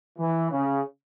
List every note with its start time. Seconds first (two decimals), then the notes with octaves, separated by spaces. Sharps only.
0.19 E3
0.51 C#3